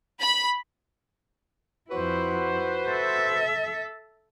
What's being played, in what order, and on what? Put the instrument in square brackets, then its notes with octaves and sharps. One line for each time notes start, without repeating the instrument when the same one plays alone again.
[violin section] B5
[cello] F2 E4 [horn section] F#4 B4 C5
[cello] A4 E5